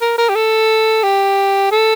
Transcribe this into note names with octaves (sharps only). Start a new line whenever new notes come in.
A#4
A#4
G4
A4
G4
A4